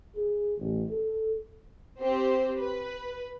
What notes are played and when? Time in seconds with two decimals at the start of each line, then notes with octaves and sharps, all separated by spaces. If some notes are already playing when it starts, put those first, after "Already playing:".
0.15 G#4
0.59 A1
0.89 A4
2.00 C4 G4 C5
2.58 B4